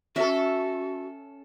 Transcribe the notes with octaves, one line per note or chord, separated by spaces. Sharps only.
C#4 F#4 A4 E5